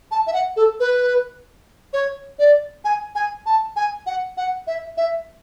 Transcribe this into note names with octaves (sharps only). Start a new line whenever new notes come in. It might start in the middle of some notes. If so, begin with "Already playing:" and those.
A5
E5
F#5
A4
B4
C#5
D5
G#5
G#5
A5
G#5
F#5
F#5
E5
E5